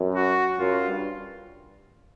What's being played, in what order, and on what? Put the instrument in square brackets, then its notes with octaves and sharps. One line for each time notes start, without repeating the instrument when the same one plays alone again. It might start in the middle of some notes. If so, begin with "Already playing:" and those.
Already playing: [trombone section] F#2
[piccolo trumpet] F#4
[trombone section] F#2 [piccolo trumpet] F4
[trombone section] G2